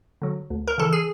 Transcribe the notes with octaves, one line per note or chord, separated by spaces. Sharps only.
D3 F#3
D2
A#4
C#3 E3 A4
G#4